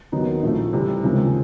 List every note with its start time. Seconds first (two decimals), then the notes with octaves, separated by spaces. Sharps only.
0.12 D#2 D#3 F#3 B3 D#4
0.43 A#1 A2 F3 A3
0.73 C3 E3 G3
1.03 D#2 C#3 F3 G#3 C4